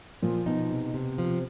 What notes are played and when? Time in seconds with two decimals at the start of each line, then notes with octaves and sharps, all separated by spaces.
0.22 A#2 F3
0.46 B2 D#4
0.70 C3
0.94 C3
1.18 F3